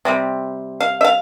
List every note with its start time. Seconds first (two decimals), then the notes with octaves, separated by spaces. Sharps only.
0.05 C3 G3 C4
0.80 F5
1.01 E5
1.04 F5